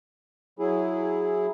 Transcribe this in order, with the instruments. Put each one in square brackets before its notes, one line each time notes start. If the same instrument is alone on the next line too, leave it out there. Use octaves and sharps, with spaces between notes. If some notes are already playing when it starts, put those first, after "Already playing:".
[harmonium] F#3 E4 G#4